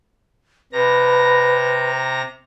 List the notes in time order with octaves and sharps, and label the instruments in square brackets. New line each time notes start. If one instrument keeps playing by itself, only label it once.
[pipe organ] C3 A#5 A#6 [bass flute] B4